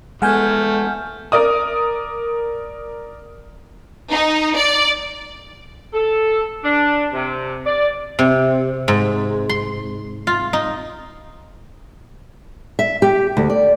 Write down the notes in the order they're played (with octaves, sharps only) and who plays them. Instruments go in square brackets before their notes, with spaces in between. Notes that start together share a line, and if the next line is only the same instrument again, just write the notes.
[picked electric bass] G#3 B3 [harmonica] A3 [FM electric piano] F#5 G#5 G6 [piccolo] F6
[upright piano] A#4 D5 D#6
[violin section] D#4
D5
[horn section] A4
D4
C3
D5
[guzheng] C3
G#2
C6
F4
D#4
[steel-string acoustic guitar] E5
G4
D2
D5